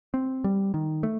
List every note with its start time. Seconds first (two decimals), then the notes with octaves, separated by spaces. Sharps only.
0.14 C4
0.44 G3
0.74 D#3
1.03 A3